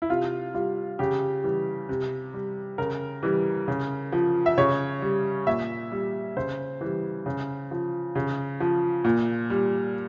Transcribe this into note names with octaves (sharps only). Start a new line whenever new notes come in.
E4
C3 F4
G3 F4
C#3 G4
E3 G3
C3
G3
C#3 A#4
E3 G3
C#3
F3
E5
C#3 C#5
G3
A#2 E5
G3
C#3 C5
E3 G3
C#3
F3
C#3
F3
A#2
G3